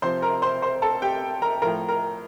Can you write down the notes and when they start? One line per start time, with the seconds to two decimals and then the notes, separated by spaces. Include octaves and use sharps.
0.02 C3 F3 C5 C6
0.22 A#4 A#5
0.42 C5 C6
0.62 C5 C6
0.82 A4 A5
1.02 G4 G5
1.42 A#4 A#5
1.62 A2 F3 A#4 A#5
1.88 A#4 A#5